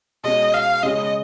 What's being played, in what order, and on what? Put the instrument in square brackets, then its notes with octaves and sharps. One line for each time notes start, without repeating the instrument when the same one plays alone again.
[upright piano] B2 G#3 C#4 [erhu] D#5
[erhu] F5
[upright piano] C#3 G#3 C#4 [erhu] D#5